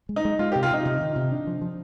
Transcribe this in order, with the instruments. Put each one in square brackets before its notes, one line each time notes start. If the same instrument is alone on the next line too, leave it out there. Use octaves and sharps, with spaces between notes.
[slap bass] G#3
[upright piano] D#4
[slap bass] G#3
[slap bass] G#3 [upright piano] F4
[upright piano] G4
[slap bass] C3
[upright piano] F4
[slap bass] C3 [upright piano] D#4
[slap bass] C3
D#3
C3
D4
F3
F3